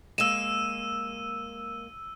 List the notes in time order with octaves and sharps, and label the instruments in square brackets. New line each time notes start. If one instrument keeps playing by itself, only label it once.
[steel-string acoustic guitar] G#3 A#3 [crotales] E6 D#7 [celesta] E7